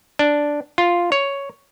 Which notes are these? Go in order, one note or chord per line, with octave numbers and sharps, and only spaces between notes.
D4
F4
C#5